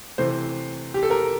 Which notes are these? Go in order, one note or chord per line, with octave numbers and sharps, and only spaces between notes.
C3 E3 A3 C5
G4
A4
A#4